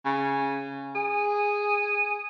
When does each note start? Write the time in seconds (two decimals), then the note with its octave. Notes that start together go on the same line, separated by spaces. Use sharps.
0.05 C#3
0.95 G#4